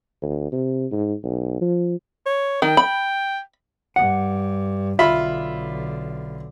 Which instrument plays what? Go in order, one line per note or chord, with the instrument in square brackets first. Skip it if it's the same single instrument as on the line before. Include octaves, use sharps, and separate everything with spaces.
[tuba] D2
C3
G#2
B1
F3
[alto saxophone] C#5
[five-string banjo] D#3 [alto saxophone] G5
[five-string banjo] B5
[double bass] G2 [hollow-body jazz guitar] F#5
[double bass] B1 D3 [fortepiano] F4 E5 B5